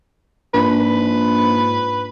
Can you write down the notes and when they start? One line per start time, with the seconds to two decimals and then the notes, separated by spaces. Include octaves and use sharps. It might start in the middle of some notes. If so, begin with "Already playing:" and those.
0.54 A#1 G#2 B4